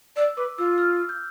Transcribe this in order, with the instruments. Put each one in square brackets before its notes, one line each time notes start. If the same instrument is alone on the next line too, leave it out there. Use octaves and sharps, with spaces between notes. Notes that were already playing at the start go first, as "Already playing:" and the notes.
[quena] D5 [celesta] E6
[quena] B4 [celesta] D6
[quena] F4 [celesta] E6
[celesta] F6
G6